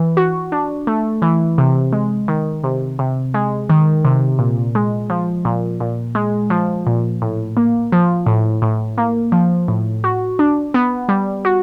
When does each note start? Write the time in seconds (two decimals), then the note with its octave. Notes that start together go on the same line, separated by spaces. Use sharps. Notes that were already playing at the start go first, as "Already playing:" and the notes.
Already playing: E3
0.17 F#4
0.52 D4
0.87 A3
1.22 E3
1.58 C3
1.93 G#3
2.28 D#3
2.64 C3
2.99 C3
3.34 G#3
3.70 D#3
4.05 C3
4.39 A#2
4.75 G#3
5.10 F3
5.45 A#2
5.80 A#2
6.15 G#3
6.50 F3
6.87 A#2
7.22 A2
7.57 A#3
7.92 F3
8.26 A2
8.62 A2
8.98 A#3
9.32 F3
9.68 A2
10.04 F#4
10.39 D4
10.74 B3
11.09 G3
11.45 F#4